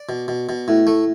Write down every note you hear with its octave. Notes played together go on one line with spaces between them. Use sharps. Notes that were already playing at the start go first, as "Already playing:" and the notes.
Already playing: D5
B2
B2
B2
A2
A3